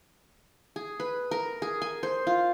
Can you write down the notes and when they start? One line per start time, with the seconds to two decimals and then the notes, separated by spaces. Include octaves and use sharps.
0.76 G#4
1.00 B4
1.31 A#4
1.62 G#4
1.82 G#5
2.03 C5
2.27 F4